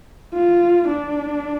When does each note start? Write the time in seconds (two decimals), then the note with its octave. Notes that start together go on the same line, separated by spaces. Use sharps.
0.34 F4
0.88 D4